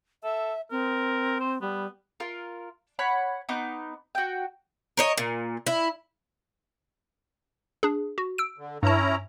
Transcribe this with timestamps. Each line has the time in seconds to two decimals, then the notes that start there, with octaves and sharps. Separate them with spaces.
0.23 A4 E5
0.71 C4 A#4
1.40 C5
1.61 G3 B3
2.20 F4 A#4
2.99 C#5 F#5 B5
3.49 B3 D#4 D6
4.15 F#4 G5
4.97 A#4 C#5 D#5
5.18 A#2
5.67 E4
7.83 D4 G#4
8.18 F#4
8.38 E6 D7
8.58 D3
8.83 G2 C#4 E4 A5 A#5